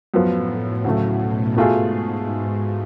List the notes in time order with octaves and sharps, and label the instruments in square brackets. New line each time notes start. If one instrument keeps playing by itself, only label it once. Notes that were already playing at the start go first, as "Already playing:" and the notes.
[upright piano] F#2 F3 B3 F4 [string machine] A2
[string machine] A2
[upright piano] D2 C#3 F#3 A3 [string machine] A2
[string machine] B2
[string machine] G#2 [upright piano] B2 A3 F4 G#4